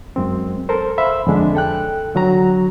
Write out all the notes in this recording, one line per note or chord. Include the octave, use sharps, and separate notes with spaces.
F#2 G#3 C4
A4 A#4 C5
C5 E5 F5 B5
F2 D3 G#3 D4
A4 G5 F#6
D3 F#3 F#4 A#5